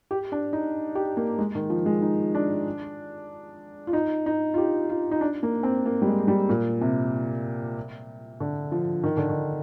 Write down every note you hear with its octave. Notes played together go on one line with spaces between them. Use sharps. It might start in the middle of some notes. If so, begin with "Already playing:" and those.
G4
D4
D#4
G4
A#3
G#3
D#3
F3
G#3
D#4
D4
F4
D#4
D#4
F4
G4
F4
D#4
D4
A#3
C4
A#3
G3
G#3
G3
A#2
C3
D3
F3
D#3
D3
D#3